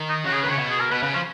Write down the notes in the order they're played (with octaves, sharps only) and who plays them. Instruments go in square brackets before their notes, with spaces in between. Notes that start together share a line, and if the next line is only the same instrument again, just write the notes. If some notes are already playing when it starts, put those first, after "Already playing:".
Already playing: [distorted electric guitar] D#3
[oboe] D#4
[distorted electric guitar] C#3 [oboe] F#4
[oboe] G#4
[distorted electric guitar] D#3 [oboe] B4
[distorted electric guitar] C#3 [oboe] C#5
[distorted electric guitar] B2
[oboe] G#4
A#4
[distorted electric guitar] B2 [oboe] B4
[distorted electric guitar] C#3 [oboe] B4
[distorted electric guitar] F3 [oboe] C#4